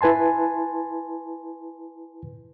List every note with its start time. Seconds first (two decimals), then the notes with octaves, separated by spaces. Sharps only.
0.01 E4 B4 G#5 A5 C6